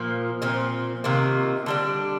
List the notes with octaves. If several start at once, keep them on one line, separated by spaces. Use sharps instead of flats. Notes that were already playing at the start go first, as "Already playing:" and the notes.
Already playing: A#2 F3 A#3
A#2 F3 C4
C3 D#3 A#3 F4
D3 G3 D4